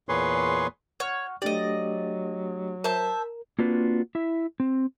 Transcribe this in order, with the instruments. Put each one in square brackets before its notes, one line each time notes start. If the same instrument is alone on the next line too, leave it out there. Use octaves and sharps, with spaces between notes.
[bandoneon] E2 A#2 G#4 B4 C#5 C6
[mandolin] C#5 [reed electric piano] F#5 C#6 F6
[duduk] F#3 [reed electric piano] A3 D4 G4 [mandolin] D5 D#5
[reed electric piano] A#4 [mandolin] C5 E5 A5
[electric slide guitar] A#3 C4 D4 F4 F#4 B4
E4 E5
C4